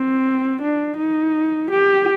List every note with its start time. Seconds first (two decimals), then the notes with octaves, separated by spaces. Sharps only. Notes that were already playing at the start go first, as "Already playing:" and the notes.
Already playing: C4
0.62 D4
0.97 D#4
1.71 G4